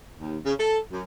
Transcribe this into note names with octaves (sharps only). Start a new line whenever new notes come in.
D#2
C#3
A4
F#2